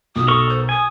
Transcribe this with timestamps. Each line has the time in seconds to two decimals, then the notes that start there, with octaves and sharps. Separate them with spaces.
0.16 B1 D#6
0.28 A4 A#4 C#6
0.49 C5
0.69 G#5 D#6